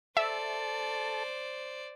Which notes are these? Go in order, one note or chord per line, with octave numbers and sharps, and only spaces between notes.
A4 C5 D5 E5